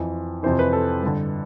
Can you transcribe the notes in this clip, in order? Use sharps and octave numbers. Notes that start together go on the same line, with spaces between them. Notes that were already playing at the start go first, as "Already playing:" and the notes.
Already playing: F2 E3
F2 C3 E3 C5
B4
A4
G2 D3